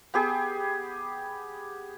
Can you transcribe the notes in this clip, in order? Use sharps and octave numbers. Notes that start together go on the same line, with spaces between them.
B3 G4 G#4